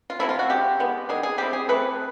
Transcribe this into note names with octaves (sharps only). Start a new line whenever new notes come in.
F4
C3 F3 A3 E4
F4
F#4
D3 F3 G#3 G4
D#3 G#3 B3
D#3 G3 B3 D4 G#4
G#4
G3 C4 E4 G4
G#4
E3 A3 C4 B4